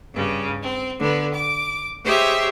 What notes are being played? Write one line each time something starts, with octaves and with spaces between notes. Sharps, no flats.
G2 C#3
C4
D3 B3
D6
G4 G#4 C5 C#5 D#5 E5